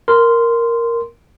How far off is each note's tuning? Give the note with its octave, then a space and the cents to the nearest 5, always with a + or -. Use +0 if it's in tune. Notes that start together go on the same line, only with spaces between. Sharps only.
A#4 +0 C6 -10